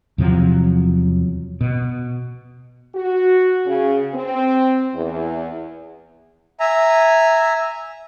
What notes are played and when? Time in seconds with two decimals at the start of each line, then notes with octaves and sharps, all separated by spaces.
0.18 E2 C3 F3 F#3
1.61 B2
2.95 F#4
3.66 C#3
4.14 C4
4.93 E2
6.60 E5 G#5 A#5